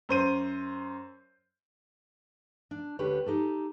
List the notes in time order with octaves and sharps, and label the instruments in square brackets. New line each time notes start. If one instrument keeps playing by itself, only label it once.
[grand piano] F#2 C5 D#7
[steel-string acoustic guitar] D4
D2 D3 G3 G4 B4 C#5
D#4 G4 A4